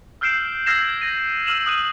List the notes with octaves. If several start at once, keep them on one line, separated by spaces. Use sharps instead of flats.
E6 F6 G6 C7 D7 E7
E6 F6 G#6 A#6 C7 E7
G#6 A#6 D#7
E6 F6 D#7 E7 F#7
D#6 F#6 D#7